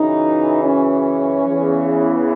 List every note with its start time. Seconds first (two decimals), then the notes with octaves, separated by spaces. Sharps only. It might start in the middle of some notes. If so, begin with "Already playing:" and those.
Already playing: F#2 C#3 E3 D#4
0.64 C#4
1.46 E2 C#3 E3